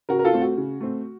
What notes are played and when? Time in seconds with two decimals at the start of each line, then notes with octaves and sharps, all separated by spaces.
0.09 C#3 F#4 A#4
0.19 A#4
0.25 F4 A4
0.33 A3 C4
0.41 F#4
0.57 C#3
0.80 A3 C4